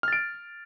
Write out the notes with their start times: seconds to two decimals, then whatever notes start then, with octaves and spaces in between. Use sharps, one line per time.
0.03 F6
0.08 A6
0.13 D7